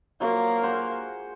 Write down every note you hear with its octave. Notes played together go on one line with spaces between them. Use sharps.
F3 F#3 A#3
G#4 C5 F#5